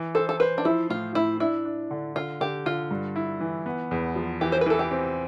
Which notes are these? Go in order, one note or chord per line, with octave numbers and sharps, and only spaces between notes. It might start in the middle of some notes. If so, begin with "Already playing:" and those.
Already playing: E3
A4 C5
A4
B4 C5
D4
F3 E4
A2 F4
A2 E4
D4 E4
D4
D3
D3 F4
D3 G4
D3 F4
G2
E4
E3
B3
E2
F3
E3 G4
C5
B4
E3 A4
G4
C4